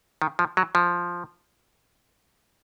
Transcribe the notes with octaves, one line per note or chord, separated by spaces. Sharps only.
D#3
F3
F#3
F3